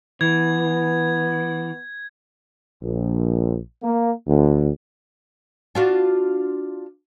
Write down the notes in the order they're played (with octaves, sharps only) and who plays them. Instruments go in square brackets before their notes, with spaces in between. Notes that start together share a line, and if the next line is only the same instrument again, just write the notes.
[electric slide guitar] E3 [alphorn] B3 [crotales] G#6
[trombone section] A#1
A#3
D2
[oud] D4 F4 F#4